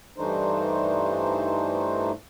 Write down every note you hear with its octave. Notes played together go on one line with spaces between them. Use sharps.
G2 E3 A3 D4 D#4 C5